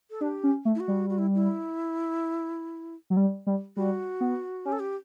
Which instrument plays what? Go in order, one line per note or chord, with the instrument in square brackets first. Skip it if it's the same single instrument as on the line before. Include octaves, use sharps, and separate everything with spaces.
[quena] A4
[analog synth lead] D4 [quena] G4
[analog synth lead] C#4
A3
[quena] E4
F#4
[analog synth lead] G3
[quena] F#4
E4
E4
[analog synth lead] F#3
G3
G3
[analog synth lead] G3 [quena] F#4
[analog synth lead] B3
[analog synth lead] C#4 [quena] G4
[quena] A4
G4